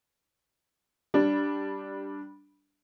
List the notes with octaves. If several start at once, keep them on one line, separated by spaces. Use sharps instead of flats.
G3 D4